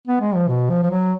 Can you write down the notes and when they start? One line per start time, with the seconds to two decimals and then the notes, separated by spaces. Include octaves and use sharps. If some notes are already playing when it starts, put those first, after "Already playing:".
0.07 B3
0.21 G#3
0.35 F3
0.48 B2
0.70 F3
0.82 F3
0.90 F#3